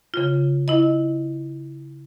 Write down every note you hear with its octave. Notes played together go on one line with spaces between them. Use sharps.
C#3 F4
E4 D#5